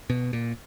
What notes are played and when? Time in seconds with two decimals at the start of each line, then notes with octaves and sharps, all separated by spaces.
0.10 B2
0.33 A#2